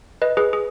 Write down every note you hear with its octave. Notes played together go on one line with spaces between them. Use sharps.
B4 D#5
G#4 B4
G#4